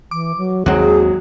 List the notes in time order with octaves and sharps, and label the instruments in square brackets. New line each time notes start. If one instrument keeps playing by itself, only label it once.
[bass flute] E3 [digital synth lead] D6
[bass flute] F#3
[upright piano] G#1 F#3 G#3 [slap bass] D#2 C4 [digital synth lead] F#4 [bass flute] G#4